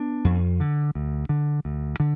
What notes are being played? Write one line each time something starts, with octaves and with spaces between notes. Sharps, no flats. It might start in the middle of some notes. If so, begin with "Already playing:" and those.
Already playing: B3 D4
F2
D3
D2
D3
D2
D3